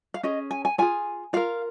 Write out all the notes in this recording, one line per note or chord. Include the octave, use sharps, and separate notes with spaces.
F5
C#4 G#4 D#5
G#5
G#5
F4 G#4 G#5
F4 A#4 F5